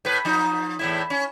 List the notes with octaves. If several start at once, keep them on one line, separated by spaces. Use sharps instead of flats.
A2 B4
F3 D#4
E2 A2 E4
C#4